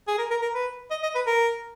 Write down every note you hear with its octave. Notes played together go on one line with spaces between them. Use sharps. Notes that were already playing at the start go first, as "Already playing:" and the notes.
G#4
A#4
A#4
A#4
B4
D#5
D#5
B4
A#4